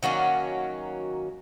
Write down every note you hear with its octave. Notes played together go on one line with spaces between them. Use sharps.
D#3 F#3 A#3 C#4